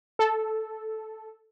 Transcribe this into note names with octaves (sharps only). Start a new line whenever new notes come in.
A4